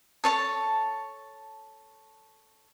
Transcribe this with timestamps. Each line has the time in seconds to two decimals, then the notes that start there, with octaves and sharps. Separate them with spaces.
0.24 A4 C#5 A5